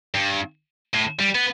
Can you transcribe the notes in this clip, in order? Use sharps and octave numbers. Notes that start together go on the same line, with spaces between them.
G2
A2
G3
B3